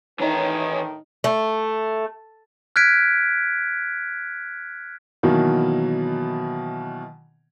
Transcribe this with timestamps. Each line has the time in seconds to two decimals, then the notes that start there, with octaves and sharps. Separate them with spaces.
0.20 A2 D#3 E3 D4 D#4 C#5 D#5 A#5
1.24 A3
2.76 F6 F#6 G#6 B6 D7
5.23 B2 D#3 E3 F#3 A#3